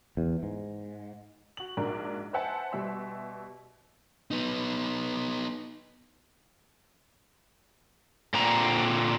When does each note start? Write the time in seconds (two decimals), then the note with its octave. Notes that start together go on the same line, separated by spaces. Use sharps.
0.17 E2
0.43 G#2
1.57 F#4 F#7
1.77 A#1 G#2 D4 F#4 A#4
2.33 B4 C5 E5 F#5 G#5 A5
2.72 B2 G3 E5 C6
4.31 B3 D#4
8.34 A#2 D3 C4 A#5